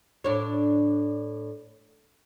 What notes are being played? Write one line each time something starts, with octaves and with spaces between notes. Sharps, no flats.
A2 D4 C#5